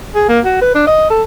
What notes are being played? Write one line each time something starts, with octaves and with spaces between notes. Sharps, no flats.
G#4
A#3
F#4
B4
D4
D#5
A4